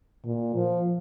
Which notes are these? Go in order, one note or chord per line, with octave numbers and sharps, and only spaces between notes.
A#2
F3